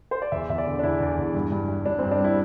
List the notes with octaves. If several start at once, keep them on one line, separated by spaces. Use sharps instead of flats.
C5
D5
E2 E5
E2 E5
D5
D3
D4
E2 E4
E2
E2
G2
G2
G2
G2 D4
C4
G2
D4
G3 E4